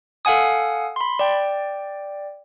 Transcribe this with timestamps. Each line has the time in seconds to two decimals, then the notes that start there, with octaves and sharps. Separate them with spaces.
0.25 A4 F5 F#5 G#5 D#6
0.96 B5 C6
1.19 D5 G5